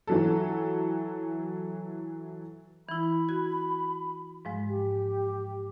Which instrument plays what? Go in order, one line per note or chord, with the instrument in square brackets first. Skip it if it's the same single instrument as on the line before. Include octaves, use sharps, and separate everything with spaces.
[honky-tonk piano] E3 F#3 A4
[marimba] E3 E4 [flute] B5
[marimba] F#4 G#6
G#2 F3 G#3
[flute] G4